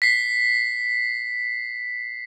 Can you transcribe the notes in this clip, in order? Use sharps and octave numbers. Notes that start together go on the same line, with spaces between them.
B6 C7